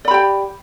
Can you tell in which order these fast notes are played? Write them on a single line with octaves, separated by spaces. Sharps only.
D5 B5 G4 G5